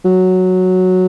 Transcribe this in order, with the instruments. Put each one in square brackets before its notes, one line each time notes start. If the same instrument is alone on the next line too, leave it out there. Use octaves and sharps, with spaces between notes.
[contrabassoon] F#3